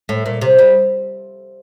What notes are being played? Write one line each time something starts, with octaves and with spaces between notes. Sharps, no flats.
A2
A#2
C3
G3